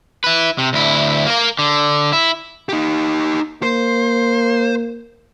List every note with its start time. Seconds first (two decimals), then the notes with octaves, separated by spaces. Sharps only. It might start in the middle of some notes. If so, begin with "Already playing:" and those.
0.24 E4 B4
0.58 C3
0.73 D2 E4
1.26 A#3 A#4
1.59 D3
2.13 E4
2.69 D#4 G4
3.63 A#3 C5